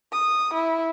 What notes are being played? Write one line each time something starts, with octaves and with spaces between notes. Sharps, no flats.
D#6
E4